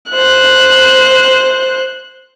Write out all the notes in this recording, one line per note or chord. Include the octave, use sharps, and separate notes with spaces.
C5 F#6